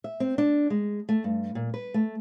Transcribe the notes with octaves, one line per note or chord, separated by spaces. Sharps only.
E5
C4
D4
G#3
A3
G2
A#2
B4
A3